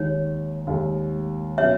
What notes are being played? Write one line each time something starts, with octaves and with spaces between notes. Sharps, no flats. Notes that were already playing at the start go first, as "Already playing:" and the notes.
Already playing: D#2 D#3 G#3 C#5
D#2 D#3 G#3
B2 F#3 C#4 C#5 E5